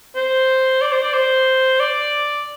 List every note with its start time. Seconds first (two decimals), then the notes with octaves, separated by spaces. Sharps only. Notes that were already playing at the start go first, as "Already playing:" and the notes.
0.15 C5
0.82 D5
0.92 C5
1.03 D5
1.14 C5
1.80 D5